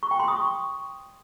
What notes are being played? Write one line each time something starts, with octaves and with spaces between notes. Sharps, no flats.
C#6
G5
C6
D#6
C#6